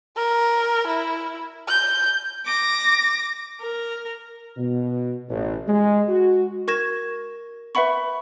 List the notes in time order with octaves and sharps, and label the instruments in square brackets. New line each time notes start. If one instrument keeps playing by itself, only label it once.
[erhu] A#4
E4
G6
[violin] D6 A#6
A#4
[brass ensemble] B2
A1
G#3
F#4
[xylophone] A#4 C#6 G#6 A#6 E7
B4 E5 F#5 B5 C#6